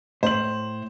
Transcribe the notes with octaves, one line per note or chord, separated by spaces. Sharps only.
A2 C5 F#7